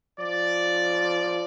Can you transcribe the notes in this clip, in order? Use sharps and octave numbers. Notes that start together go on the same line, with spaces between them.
F3 D5